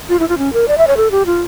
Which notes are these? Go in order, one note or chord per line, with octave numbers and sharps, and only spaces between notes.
F4
E4
F4
C#4
A#4
D5
E5
C#5
A4
G4
F4